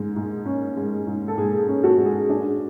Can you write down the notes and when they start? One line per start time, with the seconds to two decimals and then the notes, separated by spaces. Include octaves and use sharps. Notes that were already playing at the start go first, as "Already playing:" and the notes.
Already playing: G#2 G#3
0.16 G#2
0.46 C#4
0.76 G#3
1.07 G#2
1.28 A4
1.37 G#2 G#4
1.60 G#4
1.68 C#4
1.84 F#4 A4
1.98 G#3
2.05 G#4
2.28 D4 G#4